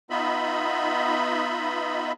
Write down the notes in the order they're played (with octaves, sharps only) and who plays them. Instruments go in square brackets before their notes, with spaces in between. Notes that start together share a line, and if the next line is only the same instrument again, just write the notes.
[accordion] B3 D#4 F4 D#5 E5 B5